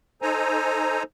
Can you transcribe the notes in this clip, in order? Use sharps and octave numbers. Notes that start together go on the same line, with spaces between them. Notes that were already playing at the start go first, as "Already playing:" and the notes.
D#4 A4 C5 G#5 A#5